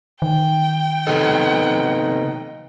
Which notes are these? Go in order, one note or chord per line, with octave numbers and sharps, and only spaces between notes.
D#3 G5
C3 B3 D#4 A4